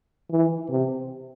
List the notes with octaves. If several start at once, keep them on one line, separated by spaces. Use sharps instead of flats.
E3
C3